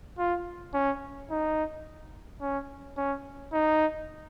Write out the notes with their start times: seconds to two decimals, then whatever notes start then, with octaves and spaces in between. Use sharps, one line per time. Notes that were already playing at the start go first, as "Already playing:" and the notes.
0.18 F4
0.74 C#4
1.30 D#4
2.41 C#4
2.97 C#4
3.53 D#4